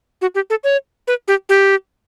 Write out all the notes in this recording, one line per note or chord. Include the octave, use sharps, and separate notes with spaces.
F#4
G4
A4
C#5
B4
G4
G4